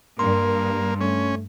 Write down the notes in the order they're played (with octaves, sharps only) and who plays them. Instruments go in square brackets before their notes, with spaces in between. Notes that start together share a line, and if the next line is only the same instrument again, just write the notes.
[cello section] G2 [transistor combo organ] A#3 [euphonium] A#4 [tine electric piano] C6
[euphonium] A3 [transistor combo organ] C#4